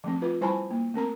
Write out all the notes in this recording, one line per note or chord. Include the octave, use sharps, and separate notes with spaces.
F3 A3 C4
F4 B4
G3 E4 C5 G#5 A5 B5
A#3
A3 C4 A#4 A#5